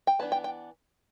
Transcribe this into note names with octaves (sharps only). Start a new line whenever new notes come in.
G5
E3 B3 D4 A5
G5
G5